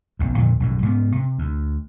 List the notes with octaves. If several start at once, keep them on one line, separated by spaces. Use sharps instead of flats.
F#1 B1 F2
F2 A#2 D3 D#3
B1 F#2 A2
G#2 C#3 B3
C3
D2